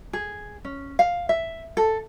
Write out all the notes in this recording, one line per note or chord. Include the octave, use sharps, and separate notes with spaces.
G#4
C#4
F5
E5
A4